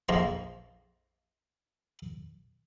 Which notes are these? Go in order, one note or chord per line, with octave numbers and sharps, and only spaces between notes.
A#1 F2 F3 A#5 C6